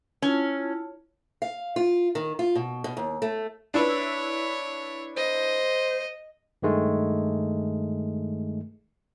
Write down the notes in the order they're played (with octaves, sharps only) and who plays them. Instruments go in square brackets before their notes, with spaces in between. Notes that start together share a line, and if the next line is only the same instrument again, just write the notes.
[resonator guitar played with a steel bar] C#4 [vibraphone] E4 F4 A5
[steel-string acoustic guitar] F5
F4
D#3
F4
B2
B2
D#2
A3
[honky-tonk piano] D4 E4 B4 [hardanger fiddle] C#5
[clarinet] C5 [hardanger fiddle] D#5
[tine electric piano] G2 D#3 G#3 A3